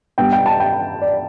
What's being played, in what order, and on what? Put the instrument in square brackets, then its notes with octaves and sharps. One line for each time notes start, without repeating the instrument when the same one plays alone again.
[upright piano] G2 G3 B3 G5
G5
A5
G5
D5